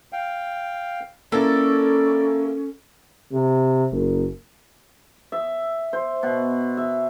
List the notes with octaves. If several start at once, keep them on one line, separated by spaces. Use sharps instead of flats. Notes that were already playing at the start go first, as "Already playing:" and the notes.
F5 G5
A#3 C#4 E4 A4 D5
C3
F#1
E5
C5
B2
E5